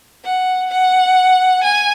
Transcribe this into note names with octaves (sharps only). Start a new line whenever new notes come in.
F#5
F#5
G#5